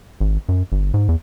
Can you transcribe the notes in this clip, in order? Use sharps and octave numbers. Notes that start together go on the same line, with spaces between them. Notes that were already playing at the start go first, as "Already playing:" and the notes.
G#1
F#2
G1
G#2
E2